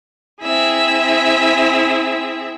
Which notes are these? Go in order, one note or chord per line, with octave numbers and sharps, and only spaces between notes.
C4 E4 G#4 E5